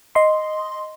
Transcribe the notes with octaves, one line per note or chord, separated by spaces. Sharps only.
D#5 C6